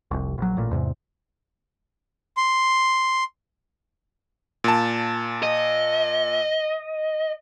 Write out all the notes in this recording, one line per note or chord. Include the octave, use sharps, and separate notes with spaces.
F1 C2
A#1 F#3
A1 A#2
E2 G#2 C3
C6
A#2 A5
D#5